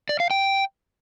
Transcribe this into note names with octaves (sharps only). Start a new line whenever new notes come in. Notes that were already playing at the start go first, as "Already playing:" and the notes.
D5
F5
G5